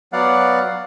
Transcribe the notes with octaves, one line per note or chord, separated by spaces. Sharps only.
F#3 B3 D5 F5 F#5